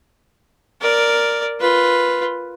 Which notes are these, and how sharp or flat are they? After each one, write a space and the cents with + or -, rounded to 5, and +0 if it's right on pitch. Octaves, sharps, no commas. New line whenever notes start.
A#4 +0 D5 -5
F4 +0 B4 +0